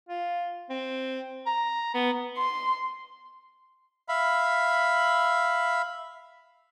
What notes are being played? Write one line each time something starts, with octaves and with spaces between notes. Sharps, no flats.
F4
C4
A#5
B3
C6
E5 F5 B5